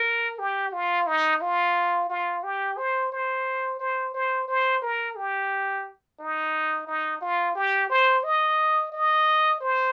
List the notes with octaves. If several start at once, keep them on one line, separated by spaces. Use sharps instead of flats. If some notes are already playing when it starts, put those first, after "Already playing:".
Already playing: A#4
G4
F4
D#4
F4
F4
G4
C5
C5
C5
C5
C5
A#4
G4
D#4
D#4
F4
G4
C5
D#5
D#5
C5